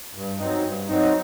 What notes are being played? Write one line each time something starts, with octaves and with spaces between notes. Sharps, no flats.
G2
F#3 C4 D#4
G2
F#3 C4 D#4